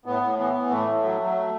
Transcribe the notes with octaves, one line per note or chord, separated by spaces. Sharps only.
A2 B3
A2
E3 B3
E3
A2 A3
A2
F#3
F#3